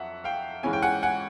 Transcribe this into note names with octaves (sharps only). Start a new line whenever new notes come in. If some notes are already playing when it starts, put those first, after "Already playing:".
Already playing: F2 F#3 E5 F#5
F5 G5
G#2 E3 G#3 C#4 E4 G#5
G5
F#5 G#5
F#5 G#5